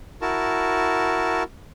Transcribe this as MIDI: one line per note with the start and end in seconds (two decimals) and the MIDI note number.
0.22 1.43 64
0.22 1.43 66
0.22 1.43 70
0.22 1.43 81